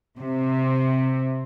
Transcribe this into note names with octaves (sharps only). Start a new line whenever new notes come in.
C3